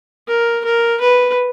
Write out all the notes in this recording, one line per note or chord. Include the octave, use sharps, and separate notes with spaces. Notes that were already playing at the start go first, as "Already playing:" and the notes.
A#4
A#4
B4